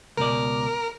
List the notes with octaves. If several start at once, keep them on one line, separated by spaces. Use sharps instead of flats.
C#2 B2 A#4 D5